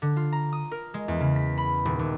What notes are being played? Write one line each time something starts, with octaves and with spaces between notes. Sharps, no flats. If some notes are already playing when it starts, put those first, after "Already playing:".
D3
F4
A#5
D#6
A#4
G#3
E2
C#3
B6
B5
D#1
D#2